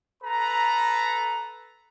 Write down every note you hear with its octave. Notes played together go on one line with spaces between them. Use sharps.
A4 B4 A#5